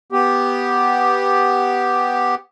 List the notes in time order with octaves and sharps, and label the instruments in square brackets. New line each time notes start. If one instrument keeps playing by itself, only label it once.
[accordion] B3 G4